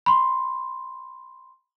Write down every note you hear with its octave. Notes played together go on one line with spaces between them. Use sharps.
B5 C6